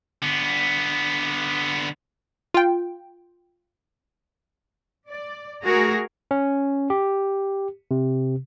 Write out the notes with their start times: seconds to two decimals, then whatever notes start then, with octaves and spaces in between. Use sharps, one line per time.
0.22 D3 B3
2.54 F4 G5
5.09 D5
5.64 A3 F#4 G#4 A#4
6.31 C#4
6.90 G4
7.91 C3